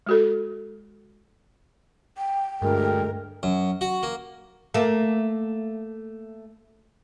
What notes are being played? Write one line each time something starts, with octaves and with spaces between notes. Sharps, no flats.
G#3 F#4 A4
G5
D2 G2 G#3 A#4
F#2
F#4
A#3
A3 A#3